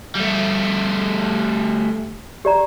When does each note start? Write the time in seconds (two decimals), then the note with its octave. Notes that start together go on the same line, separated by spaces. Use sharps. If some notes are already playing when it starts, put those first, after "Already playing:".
0.15 G3 A3
2.45 G4 D5 A#5